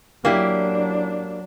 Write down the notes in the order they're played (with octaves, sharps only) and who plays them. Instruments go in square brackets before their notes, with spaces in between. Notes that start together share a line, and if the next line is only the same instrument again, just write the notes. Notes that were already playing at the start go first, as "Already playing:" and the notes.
[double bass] F#3 D4 [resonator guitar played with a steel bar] A#3 E4 G4